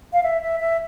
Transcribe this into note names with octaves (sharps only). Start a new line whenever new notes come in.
F5
E5
E5
E5